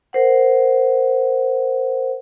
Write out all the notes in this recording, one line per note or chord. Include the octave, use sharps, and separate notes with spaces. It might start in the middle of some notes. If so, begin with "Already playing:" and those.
A#4 C5 F#5